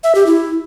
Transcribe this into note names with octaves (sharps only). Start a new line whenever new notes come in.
E5
G4
E4